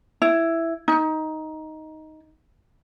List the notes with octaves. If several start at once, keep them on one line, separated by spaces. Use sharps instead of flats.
E4
D#4